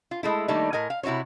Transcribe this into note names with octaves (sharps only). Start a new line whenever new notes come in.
F4
G#3 A3 E4
D#3 G3 A3 A#3 D4 D#4
A2 A#4 D#5 G#5
F5
C3 E4 F#4 C5 C#5